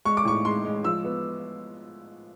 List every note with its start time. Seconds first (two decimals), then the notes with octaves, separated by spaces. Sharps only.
0.05 G#3 C#6
0.17 D6
0.25 A2 C#6
0.45 G#3 C6
0.65 G#3
0.84 F3 E6
1.05 B3